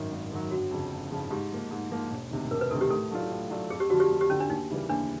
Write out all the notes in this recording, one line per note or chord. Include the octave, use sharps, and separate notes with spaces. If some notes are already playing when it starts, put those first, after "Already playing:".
Already playing: G#1 F#2 D#3 F#3
G#1
F#2 D#3 F#3
G1 F#4
F2 C#3 F3
G1
F2 C#3 F3
G#2 G4
F3 A#3
G#2
F3 A#3
E1
D2 C3 D#3
E1 A#4
B4
D2 C3 D#3 A4
G4
A2 A4
F#3 A3 D4 F4
A2
F#3 A3 D4 F4
F2 G#4
G4
D3 F3 F#4
G4
F2
G4
D3 F3 C#4
D4
D#2 D#4
C#3 E3 G3 A#3
D#2 D4